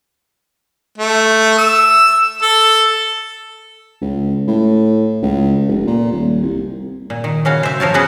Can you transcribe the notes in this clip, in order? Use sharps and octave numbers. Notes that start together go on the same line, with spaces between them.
A3
E6
A4
C#2
A2
C#2
F1
A#2
D#1
C2
A#2
D#3
C#3 C#4 F#4 F5
C5 E5
F3 A#4 C#5 A5
C#3 B3 C#4 F#4 G#4 B4